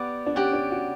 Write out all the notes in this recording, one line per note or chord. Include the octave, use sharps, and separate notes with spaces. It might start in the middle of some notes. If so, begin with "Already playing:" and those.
Already playing: B3 G4 D5 F#5
D4
C#4 G4 D5 F#5
D4
F#4